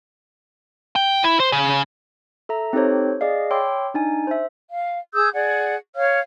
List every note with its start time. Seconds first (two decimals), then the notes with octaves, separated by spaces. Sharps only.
0.96 G5
1.24 E4
1.40 C5
1.52 C#3
2.49 A4 E5 A#5
2.73 C4 D#4 G4 A4 C5 C#5
3.21 G#4 D5 D#5 F5
3.51 C#5 G5 B5 C6 D6 E6
3.94 D4 D#4 G#5
4.27 C5 E5
4.71 F5
5.13 G#4 D#6 E6 G6
5.33 G#4 D5 F#5
5.95 C#5 F5 F6